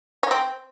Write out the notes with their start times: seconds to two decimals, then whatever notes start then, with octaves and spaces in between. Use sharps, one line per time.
0.23 C#4
0.31 C4